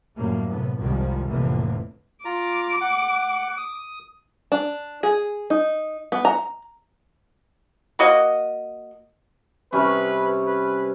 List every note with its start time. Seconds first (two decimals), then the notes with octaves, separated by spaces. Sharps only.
0.16 F#2 A2 D3 G3 A3 A#3
0.48 A2 C3 B3
0.79 C2 F2 D#3 F3 G3 G#3
1.29 F1 A2 D3 E3 A#3
2.25 F4 A#5 D6
2.81 F#5
3.58 D#6
4.52 D4
5.03 G#4
5.50 D#4
6.12 B3
6.25 A#5
7.99 A#3 F#4 D#5
9.72 C3 G3 C#4 B4
10.46 B4